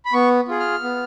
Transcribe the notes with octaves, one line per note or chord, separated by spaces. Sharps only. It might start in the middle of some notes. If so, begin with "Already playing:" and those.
B5
B3 C#6
F4 G#4
F6
B3